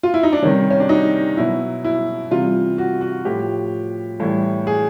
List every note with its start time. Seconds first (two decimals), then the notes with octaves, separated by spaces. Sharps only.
0.03 F4
0.14 E4
0.23 D#4
0.33 D4
0.42 C3 D#3 G3 C#4
0.70 C#4
0.80 D4
0.89 D#4
1.37 B2 F#3 E4
1.84 E4
2.31 C3 E3 G3 F4
2.78 F#4
3.01 F#4
3.25 A2 F3 G4
4.20 A2 E3 G3
4.67 G#4